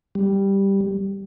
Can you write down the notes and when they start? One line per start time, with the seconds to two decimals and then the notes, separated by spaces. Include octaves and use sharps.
0.15 G3